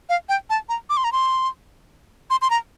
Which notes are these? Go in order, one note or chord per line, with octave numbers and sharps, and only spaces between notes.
F5
G5
A5
A#5
D6
C6
A#5
C6
C6
C6
A#5